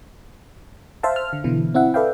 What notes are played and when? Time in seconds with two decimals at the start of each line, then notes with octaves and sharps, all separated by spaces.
1.03 C5 E5 F5 A5
1.16 F6
1.33 D3
1.44 B2 D3 E3 E4
1.74 C4 E4 E5 F#5
1.94 A4 B4 D5 E5 F5 G5